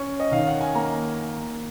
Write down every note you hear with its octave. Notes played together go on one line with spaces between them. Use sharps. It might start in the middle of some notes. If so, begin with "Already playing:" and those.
Already playing: C#4 C#6
D#5
D#3 F5
F#5
G#5
A#3 A#5